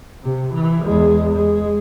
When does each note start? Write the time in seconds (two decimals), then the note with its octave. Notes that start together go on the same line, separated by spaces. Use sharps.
0.24 C3
0.54 E3
0.85 E2 G#3
1.36 G#3